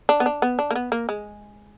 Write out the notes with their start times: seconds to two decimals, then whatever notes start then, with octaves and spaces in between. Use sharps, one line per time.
0.09 D4
0.20 B3
0.26 D4
0.42 B3
0.59 D4
0.71 A#3
0.75 B3
0.92 A#3
1.09 G#3